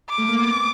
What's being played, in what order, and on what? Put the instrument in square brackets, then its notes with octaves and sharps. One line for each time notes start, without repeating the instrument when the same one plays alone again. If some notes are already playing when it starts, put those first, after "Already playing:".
[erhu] D6
[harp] A3
A#3
B3
C4